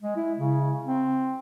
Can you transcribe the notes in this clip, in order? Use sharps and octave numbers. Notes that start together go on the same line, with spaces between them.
G#3
E4
C#3
C4